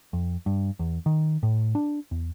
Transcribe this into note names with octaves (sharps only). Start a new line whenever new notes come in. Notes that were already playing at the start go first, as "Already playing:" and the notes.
F2
G2
E2
D#3
A2
D4
E2